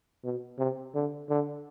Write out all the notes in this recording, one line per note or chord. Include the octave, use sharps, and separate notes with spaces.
B2
C3
D3
D3